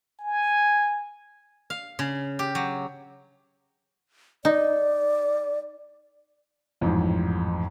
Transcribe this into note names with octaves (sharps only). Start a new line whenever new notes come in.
G#5
F5
C#3
G4
F#3
D#4 D5
A1 F2 G#2